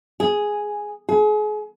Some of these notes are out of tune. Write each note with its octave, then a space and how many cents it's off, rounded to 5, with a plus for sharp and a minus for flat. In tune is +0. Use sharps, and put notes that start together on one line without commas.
G#4 +0
G#4 +35